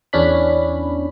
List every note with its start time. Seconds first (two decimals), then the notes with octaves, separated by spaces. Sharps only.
0.13 E2 C#4 D4 B5